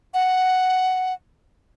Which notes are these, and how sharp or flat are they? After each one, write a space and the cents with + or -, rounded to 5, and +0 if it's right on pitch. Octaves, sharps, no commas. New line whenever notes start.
F#5 +5